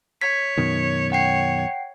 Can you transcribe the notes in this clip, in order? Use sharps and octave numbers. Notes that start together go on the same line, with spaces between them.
C#5 G#6 B6
F#2 B2 D#3
C#5 F#5 G5 C7